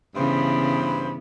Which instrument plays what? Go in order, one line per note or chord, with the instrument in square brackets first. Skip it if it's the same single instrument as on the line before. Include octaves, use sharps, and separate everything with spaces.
[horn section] G2 C5 B5 [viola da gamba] C#3 E3 B3